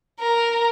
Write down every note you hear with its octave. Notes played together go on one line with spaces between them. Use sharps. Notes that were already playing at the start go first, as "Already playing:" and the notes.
A#4